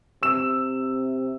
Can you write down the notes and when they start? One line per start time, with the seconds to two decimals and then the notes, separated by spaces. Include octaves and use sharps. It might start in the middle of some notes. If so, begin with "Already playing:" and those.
0.23 C3 E6 E7